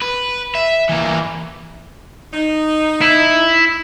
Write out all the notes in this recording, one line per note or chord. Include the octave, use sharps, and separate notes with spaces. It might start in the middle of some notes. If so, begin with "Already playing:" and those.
B4
E5
E3 A#3
D#4
E4